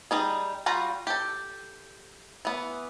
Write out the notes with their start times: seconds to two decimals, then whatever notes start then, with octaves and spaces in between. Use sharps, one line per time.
0.11 G3 D#4 G#4
0.66 G3 F4 F#4 F#5 A#5
1.07 G4 A4
2.45 E3 B3